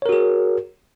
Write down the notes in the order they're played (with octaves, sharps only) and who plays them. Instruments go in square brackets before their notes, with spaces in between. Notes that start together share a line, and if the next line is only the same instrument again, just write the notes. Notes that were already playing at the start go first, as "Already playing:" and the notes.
[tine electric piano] C#5
A#4
F#4
G#4